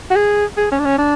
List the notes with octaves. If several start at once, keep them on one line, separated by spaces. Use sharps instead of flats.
F#4
G#4
G#4
C#4
D4
C#4
D4